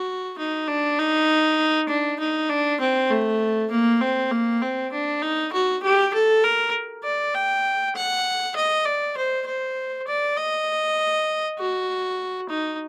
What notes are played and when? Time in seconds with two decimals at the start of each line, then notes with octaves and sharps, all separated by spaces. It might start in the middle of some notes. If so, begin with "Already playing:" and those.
Already playing: F#4
0.38 D#4
0.68 D4
0.99 D#4
1.89 D4
2.20 D#4
2.49 D4
2.80 C4
3.11 A3
3.71 A#3
4.01 C4
4.31 A#3
4.62 C4
4.92 D4
5.22 D#4
5.52 F#4
5.83 G4
6.14 A4
6.44 A#4
7.04 D5
7.34 G5
7.95 F#5
8.55 D#5
8.85 D5
9.17 C5
9.46 C5
10.07 D5
10.37 D#5
11.59 F#4
12.50 D#4